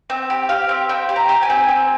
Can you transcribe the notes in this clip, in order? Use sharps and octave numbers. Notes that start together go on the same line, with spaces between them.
C4
G4
G4 F5
C4
C4 G5
G4
A#5
G4
G#5
C4
C4